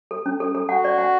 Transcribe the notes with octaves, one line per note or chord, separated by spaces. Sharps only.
A4
C#4
A4
A4
F#4 F#5
D5
F#5